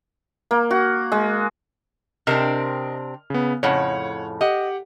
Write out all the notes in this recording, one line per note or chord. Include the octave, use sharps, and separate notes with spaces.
A#3
F#4
G#3
C3 C4 D4 A#4 D#5 F6
C#3 B3
F2 A2 C#3 C#5 F#5
G4 D#5 F#5